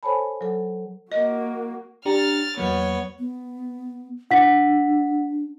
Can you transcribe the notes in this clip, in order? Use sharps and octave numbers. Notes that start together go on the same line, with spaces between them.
A4 C5 C#5 G#5 A5 B5
F#3 A4
A#3 F#4 D#5
D4 G4 A#5 F6 A6
E2 F#3 A#3 B3 C#5
B3
D4 F#5 B6